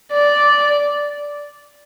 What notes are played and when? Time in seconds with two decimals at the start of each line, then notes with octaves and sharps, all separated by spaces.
0.13 D5